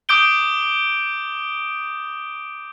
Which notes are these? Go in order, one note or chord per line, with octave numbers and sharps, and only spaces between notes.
D6 D#6 G6 D7 G7